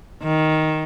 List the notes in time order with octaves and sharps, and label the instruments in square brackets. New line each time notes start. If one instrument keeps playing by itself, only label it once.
[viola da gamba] D#3